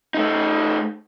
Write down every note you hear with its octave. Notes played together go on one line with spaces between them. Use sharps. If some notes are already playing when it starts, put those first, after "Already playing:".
A3 D#4